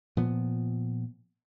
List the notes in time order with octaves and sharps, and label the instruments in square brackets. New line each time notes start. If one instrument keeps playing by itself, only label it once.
[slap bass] A#2 F3 B3